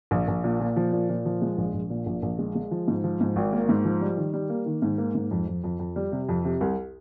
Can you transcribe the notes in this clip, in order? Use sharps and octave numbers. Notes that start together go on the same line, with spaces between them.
A#1
A#1
A#2
A#2
F3
A#2
A#2
F3
G#3
A#1
A#1
A#2
A#1
A#1
G#3
G#3
F3
G#2
F3
G#2
G#1
A#3
G#2
F3
G3
D#3
G3
A#3
D#3
G#2
A#3
G#2
F2
F2
F2
F2
G3
C3
F2
C3
C2